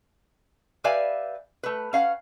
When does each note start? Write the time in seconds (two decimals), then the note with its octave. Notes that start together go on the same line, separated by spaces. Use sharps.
0.84 G4 B4 D5 E5 F5 G#5
1.63 A3 B4
1.93 C#4 F5 F#5